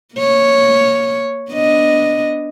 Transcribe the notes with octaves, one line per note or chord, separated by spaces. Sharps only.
A#3 C#5
B3 D4 D#5